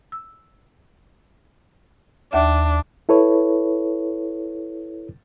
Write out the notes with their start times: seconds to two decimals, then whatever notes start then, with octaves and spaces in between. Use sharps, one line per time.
0.12 E6
2.33 D#2 D4 E5
3.09 E4 A4 B4 C#5